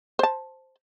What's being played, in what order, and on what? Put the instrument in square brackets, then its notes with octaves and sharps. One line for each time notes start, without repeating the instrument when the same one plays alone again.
[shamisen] C5 A5